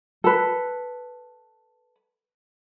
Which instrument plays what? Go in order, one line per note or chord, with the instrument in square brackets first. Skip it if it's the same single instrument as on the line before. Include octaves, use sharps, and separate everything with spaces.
[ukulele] A4 B4